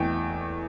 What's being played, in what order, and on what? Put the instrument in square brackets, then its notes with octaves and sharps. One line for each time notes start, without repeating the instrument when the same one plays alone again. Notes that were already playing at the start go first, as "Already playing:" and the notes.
Already playing: [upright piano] E2 A3 G5